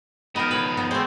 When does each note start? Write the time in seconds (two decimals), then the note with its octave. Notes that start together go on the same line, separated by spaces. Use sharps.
0.36 F3 B3 D#4 A#4
0.51 B4 C#5
0.77 B3
0.91 G#3 A3 C5 G5